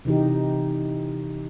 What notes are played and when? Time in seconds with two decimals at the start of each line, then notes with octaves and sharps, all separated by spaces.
0.05 C3 E3 D#4 G4